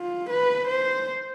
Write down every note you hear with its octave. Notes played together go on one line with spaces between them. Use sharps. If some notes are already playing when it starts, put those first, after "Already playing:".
Already playing: F4
B4
C5